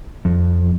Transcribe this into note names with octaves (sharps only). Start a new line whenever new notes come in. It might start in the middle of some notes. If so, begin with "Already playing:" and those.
F2